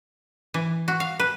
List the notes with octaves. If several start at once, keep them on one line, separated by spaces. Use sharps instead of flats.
E3
F#4
F5
B4